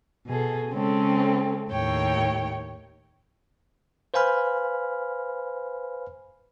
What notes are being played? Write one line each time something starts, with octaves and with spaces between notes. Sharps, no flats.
B2 G#4 A4
C#3 G#3 C4 C#4 A4
D#2 A2 C#5 G5
B4 C5 F5 G#5 B5 F6